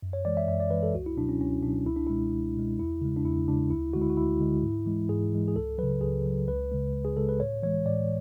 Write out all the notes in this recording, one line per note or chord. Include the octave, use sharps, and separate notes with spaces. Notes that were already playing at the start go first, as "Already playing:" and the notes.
F#2
C#5
E3 G#3 D5
E5
F#2 E5
D5
E3 G#3 B4
A4
C#2 F#4
E4
B2 F#3 D4
C#4
C#2 C#4
B2 F#3 D4
C#2 E4
D4
B2 G#3 E4
C#2
B2 G#3
E2 E4
C#3 G#3
D4
E2 E4
C#3 G#3 D4
D2 E4
D3 G#3 F#4
E4
F#4
D2 E4
D3 G#3
G#2
E3 G#3
G#2 G#4
E3 G#3
G#4
C#2 A4
C#3 F#3 B4
C#2 G#4
C#3 F#3
C#2 B4
C#3 G#3
C#2
G#4
C#3 G#3 A4
B4
A2 C#5
E3 G#3 C#5
A2 D5